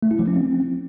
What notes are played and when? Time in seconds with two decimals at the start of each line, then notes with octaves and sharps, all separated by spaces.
0.03 A3
0.11 E4
0.19 F3
0.28 C#4
0.36 C4